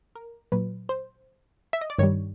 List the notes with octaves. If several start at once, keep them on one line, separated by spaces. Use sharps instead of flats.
A#4
A#2 F#3 B4
C5
E5
D#5
D5
G2 D#3 G3 C#5